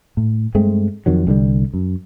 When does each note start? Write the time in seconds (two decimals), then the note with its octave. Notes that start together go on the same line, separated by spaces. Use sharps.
0.17 A2
0.55 G2 G#3 A3 C4
1.06 F2 D#3 F#3
1.27 C2 D3 E3 G3
1.74 F#2